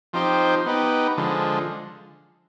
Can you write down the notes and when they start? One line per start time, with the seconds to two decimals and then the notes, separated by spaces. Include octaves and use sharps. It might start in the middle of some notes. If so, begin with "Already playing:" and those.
0.13 F3 C4 D#4 G4 C5
0.66 B3 D#4 G4 B4
1.17 D3 F3 G#3